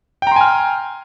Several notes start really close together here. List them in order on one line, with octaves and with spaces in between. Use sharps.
G5 A#5 C6 G#5 F6